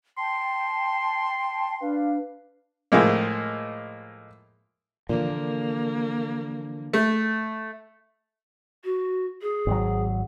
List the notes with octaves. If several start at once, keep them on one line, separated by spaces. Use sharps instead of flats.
G5 A5 C6
D4 B4 F5
A2 F3 G#3 A#3
A#2 D3 E3 F3 A#3
A3
F#4
G#4
G#1 F#3